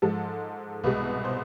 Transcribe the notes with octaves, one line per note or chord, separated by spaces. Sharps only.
G#2 F3 G#3 A4
C2 B2 G#3 B4
C5